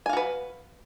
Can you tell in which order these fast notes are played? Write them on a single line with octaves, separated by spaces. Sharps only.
G#5 F5 F#4 B4